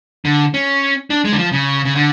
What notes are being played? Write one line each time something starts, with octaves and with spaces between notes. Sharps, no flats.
D3
C#4
D4
G#3
D3
F3
C#3
C#3
D3